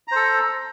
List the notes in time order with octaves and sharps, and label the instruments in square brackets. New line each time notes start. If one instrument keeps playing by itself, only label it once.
[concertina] A#5
C5
A4